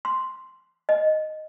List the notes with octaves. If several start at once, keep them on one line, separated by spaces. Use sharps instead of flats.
C6
D#5